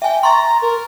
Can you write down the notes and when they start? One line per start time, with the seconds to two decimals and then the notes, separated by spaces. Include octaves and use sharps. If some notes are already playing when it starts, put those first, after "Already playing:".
0.02 E5 G5 G#5
0.23 A#5 C6 C#6 A6
0.62 A#4